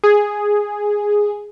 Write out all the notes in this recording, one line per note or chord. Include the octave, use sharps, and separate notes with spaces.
G#4